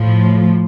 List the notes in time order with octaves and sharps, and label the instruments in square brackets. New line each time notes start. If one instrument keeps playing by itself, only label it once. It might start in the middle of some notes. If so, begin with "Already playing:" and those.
Already playing: [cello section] A2 F3